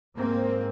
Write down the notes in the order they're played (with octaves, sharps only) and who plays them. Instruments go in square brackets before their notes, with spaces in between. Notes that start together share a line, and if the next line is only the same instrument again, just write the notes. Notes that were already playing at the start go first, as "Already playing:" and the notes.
[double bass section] G#2 A#3 C4